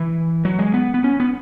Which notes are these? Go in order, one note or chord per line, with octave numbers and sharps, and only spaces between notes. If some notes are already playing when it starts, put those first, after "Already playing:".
Already playing: E3
F#3
G#3
B3
B3
C#4
B3